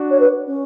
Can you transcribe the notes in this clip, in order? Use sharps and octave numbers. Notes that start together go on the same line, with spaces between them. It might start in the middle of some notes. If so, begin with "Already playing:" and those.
Already playing: D4 F#4
C#5
B4
C#4